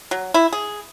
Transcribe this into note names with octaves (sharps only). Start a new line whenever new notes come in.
F#3
E4
G#4